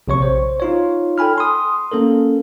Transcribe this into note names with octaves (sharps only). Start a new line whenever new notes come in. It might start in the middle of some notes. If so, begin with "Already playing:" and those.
A#1 C3 C#5 C#6
C5
D#4 F4 C#5
A4 G5 G#5 B5 F6
C6 D#6
A#3 C#4 A4 A#4